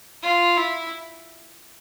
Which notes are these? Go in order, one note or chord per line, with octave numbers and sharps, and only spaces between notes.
F4
E4